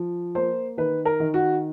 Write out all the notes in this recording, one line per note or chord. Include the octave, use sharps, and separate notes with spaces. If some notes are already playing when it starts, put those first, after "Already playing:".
Already playing: F3
A#3 C5
D#3 B4
A#4
D#3
F#4